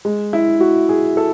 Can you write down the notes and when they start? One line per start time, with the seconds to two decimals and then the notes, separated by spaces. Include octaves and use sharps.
0.05 G#3
0.33 E4
0.60 F#4
0.89 G#4
1.17 A4